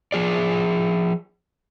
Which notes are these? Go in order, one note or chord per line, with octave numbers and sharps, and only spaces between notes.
F3 G#4 D5